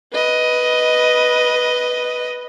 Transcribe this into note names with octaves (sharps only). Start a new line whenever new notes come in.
B4 D#5